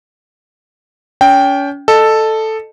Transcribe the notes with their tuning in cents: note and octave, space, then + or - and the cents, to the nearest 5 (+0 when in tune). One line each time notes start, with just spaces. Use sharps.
C#4 +35 G5 +0
A4 +0 D#5 -20